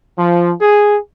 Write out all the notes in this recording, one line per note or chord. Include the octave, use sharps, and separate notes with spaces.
F3
G#4